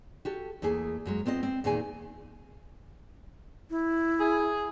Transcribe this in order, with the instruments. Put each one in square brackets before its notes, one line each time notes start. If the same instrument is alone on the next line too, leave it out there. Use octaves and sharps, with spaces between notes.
[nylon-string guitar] F#4 G4 A4
E2 A3 A#3 G#4
F#2 F#3 G#3
B3 C4 F4 D#5
C4
E2 A#2 D#3 G#4 G#5
[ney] E4
[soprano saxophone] G#4